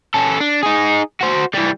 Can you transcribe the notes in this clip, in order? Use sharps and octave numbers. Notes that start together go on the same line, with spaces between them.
C#4 A4
D4
D#4 G#4
F#4 C5
E3 G3